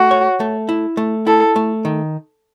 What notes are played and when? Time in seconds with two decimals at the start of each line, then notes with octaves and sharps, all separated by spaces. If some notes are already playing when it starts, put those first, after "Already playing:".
Already playing: A3 F#4
0.11 C#5
0.40 A3
0.69 E4
0.97 A3
1.27 E4 A4
1.56 A3
1.85 D#3